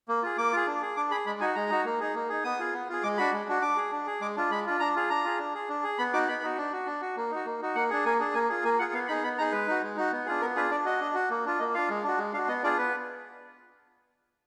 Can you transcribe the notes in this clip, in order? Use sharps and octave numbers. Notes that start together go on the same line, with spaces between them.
A#3
F4 G#4
A#3 D6
F4 G#4
D4
G#4
D4 D6
G#4 B5
G#3 B5
D#4 F#4 G#5
G#3 A#5
D#4 F#4
A#3
D#4 G#4
A#3
D#4 G#4
B3 D#6
F4 G#4
B3
F4 G#4
G#3 D6
D4 F#4 B5
G#3
D4 F#4
D4 D6
G#4
D4
G#4
G#3 D6
D4 F4
G#3 B5
D4 F4
D4 A#5
F4 G#4
D4 A#5
F4 G#4
D4
G#4
D4
G#4
B3 B5
D#4 F#4 D6
B3 B5
D#4 F#4
D4
F#4
D4
F#4
A#3
D#4 F#4
A#3
D#4 F#4
A#3 F#5
D4 G#4
A#3 G#5
D4 G#4
A#3 G#5
F4 G#4
A#3 G#5
F4 G#4 F#5
B3 F5
D#4 G#4 B5
B3 B5
D#4 G#4 A#5
G#3 B4
D#4 F#4
G#3
D#4 F#4
B3
D4 F4 G#4
B3 A#4
D4 F4 G#4 B4
D4 D5
F#4 D#5
D4
F#4
A#3
D4 F4
A#3 D#5
D4 F4 F5
G#3
D4 F#4
G#3
D4 F#4 F5
B3 D#5
D4 F4 G#4 D5
B3 B4